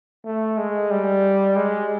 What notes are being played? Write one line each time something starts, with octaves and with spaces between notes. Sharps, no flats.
A3
G#3
G3
G#3